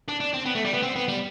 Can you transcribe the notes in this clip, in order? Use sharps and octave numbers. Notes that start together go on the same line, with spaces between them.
D4
D4
C4
B3
A3
G3
B3
C4
B3
G3